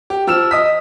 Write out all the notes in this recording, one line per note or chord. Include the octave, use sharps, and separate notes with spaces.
G4
F3 E6 F6 E7
D#5 D#6 B6